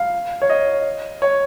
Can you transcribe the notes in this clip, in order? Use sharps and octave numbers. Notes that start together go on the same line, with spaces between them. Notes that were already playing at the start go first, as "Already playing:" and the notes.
Already playing: F5
C#5
D#5
C#5